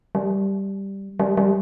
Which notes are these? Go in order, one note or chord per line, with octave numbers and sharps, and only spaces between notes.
G3
G3
G3